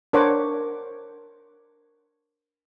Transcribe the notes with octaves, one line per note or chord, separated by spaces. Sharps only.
D4 A#4 C5 C#5 F#5 D6